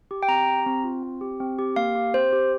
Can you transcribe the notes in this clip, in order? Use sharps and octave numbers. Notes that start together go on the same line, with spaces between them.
G4
G5
C4 A#5
G4
C4
F4
C4
G4
C4
G4
A#3 F5
G4
C4 C5
G4